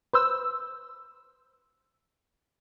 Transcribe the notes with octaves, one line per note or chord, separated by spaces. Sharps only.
B4 C5 E6